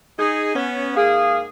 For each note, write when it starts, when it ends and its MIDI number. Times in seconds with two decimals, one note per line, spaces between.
0.19 0.52 63
0.19 0.52 68
0.54 0.93 59
0.54 0.93 61
0.96 1.48 44
0.96 1.48 58
0.96 1.48 68
0.96 1.42 77